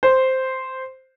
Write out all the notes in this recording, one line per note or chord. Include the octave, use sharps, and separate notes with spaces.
C5